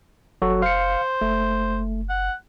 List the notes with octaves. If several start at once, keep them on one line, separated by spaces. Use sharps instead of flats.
F#1 F#3 F#4 A4
C5 F5 C#7
F#1 A3
F#5